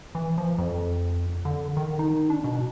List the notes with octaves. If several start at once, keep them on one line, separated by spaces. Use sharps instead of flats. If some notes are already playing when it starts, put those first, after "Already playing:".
E3
F3
F2
D3
D#3
D#4
D4
B2